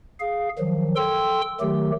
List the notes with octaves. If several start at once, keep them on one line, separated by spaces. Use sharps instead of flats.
G#4 F5
D#3 F3 F#3
A4 G5 C6 E6
D#3 F#3 A3 G4